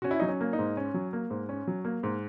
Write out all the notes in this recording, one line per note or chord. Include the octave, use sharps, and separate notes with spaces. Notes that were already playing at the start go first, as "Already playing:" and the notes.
C#4 F#4
E4
F#3 D#4
C#4
A#3
D#4
G#2
C#4
F#3
A#3
G#2
C#4
F#3
A#3
G#2